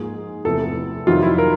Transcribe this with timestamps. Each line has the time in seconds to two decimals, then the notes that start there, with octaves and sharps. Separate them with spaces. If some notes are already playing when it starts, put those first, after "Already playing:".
Already playing: G#2 F3 A#3 G#4
0.45 E2 C3 F3 A3 A4
1.07 F2 C3 D#3 F#3 F4
1.23 E4
1.38 A#4